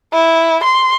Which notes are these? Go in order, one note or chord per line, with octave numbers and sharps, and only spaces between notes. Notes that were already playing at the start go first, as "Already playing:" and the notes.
E4
C6